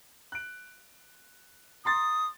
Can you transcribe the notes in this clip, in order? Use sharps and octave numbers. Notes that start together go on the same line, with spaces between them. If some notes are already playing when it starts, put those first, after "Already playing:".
F#6 D7
A#5 C6 D#6 A6